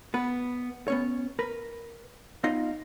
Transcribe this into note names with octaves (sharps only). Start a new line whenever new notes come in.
B3 B4
B3 C#4 C#5
A#4 B4 B5
B3 D#4 F4 D#5 F5